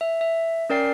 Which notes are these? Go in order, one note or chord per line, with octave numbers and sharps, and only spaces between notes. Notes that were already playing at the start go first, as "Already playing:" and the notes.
E5
E5
C#4 A#4 D5 G5 C7